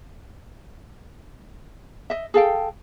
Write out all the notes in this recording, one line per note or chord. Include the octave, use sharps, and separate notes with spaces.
D#5 E5
G#4 A4 F5 G5